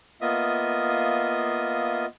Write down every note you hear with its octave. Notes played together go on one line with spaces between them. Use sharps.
A#3 B3 F4 D#5 E5 D#6